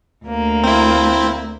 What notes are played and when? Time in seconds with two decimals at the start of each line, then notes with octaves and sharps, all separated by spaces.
0.24 D2 A#3
0.63 C4 E4